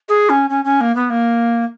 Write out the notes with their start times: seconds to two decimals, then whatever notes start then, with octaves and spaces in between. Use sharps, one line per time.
0.09 G#4
0.29 C#4
0.50 C#4
0.65 C#4
0.81 A#3
0.95 B3
1.10 A#3